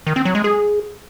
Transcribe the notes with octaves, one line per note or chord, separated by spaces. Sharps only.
D#3
C4
F#3
G#3
G#4